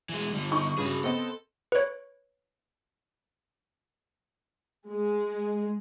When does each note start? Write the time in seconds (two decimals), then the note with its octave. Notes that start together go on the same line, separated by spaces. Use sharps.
0.09 E3 G#3
0.33 D3 G3
0.51 D#4 G4 C#6
0.78 G2 C#3 C#4 F#4 G#4
1.04 B3 C4 A4 D#5
1.72 B4 C#5
4.88 G#3